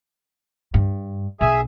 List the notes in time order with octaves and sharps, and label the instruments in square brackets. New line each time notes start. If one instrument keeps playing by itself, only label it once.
[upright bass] G2
[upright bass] B1 [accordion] G#4 E5 G#5